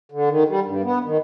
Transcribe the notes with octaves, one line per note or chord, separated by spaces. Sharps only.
D3
D#3
G3
G2
B3
D#3